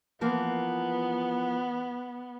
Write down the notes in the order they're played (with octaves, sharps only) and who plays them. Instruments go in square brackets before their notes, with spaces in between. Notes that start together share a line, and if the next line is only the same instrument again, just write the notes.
[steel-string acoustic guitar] E3 F3 A#3 [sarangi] B3